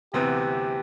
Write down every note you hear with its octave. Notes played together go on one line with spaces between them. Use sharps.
D2 C3 E3 B3 G4